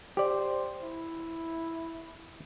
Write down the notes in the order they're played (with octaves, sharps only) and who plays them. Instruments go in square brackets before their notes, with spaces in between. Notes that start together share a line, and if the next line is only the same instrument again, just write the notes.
[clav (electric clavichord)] G4 D5 [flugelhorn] C5
[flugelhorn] E4